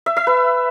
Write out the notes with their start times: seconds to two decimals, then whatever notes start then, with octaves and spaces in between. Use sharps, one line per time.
0.06 E5
0.17 E5
0.27 B4